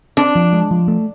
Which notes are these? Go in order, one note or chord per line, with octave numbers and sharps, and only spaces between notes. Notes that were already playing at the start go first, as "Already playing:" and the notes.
C4 D4
F3
G#3
F3
A3